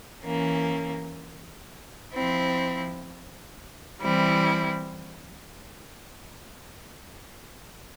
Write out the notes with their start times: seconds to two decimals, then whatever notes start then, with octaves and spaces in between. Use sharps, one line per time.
0.25 E3 A#3 C#4
2.13 F3 C4 E4
4.01 E3 G3 C4 E4